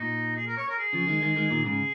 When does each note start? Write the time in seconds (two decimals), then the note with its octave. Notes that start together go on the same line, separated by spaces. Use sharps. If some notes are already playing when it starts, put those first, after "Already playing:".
Already playing: A#2 D#4
0.36 G#4
0.47 A#4
0.57 C#5
0.69 A#4
0.79 G#4
0.93 C#3 F3
1.07 D#3 G#3
1.22 D#3 G#3
1.36 D#3 G#3
1.50 A#2 D#3
1.65 G#2 C#3 G#4